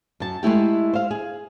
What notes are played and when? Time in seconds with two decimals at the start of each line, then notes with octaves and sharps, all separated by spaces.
0.20 F#2 A5
0.43 G#3 A3 E4 G4
0.93 C5 F5
1.11 G#4